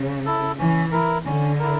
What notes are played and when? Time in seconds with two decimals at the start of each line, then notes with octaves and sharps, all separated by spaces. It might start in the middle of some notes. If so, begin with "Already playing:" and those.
Already playing: C#3
0.26 E4 A4
0.59 E3 C#4
0.92 E4 A#4
1.26 D3 C#4
1.59 E4 A#4